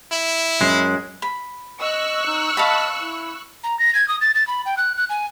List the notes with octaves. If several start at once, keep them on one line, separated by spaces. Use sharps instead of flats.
E4
F#2 G#3
B5
D#5 C#6 E6 F#6
D#4
D#5 F5 A5 B5
E4
A#5
A#6
G#6
D#6
A6
A6
B5
G5
F#6
F#6
G#5